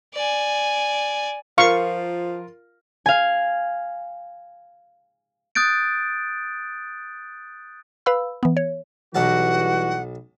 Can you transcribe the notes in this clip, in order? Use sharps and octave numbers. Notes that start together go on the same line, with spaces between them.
D5 G#5
F3 F4 A#4 F5 C#6
F5 G#5
D#6 F#6 G6 A6 D7
B4 F5 B5 E6
E3 B3
C#5
B1 E3 G3 F#4 F#5 A5